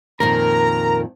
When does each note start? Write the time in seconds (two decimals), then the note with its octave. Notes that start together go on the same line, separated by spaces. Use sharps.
0.20 F2 A#2 D#3 A#4 A#5